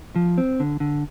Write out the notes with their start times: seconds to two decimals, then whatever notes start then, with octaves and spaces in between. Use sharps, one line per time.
0.16 F3
0.38 C4
0.60 D3
0.80 D3